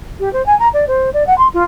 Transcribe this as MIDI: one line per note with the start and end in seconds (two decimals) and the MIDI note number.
0.19 0.31 67
0.33 0.44 72
0.46 0.57 80
0.59 0.68 82
0.73 0.85 74
0.87 1.09 72
1.13 1.26 74
1.26 1.36 78
1.37 1.47 84
1.53 1.63 65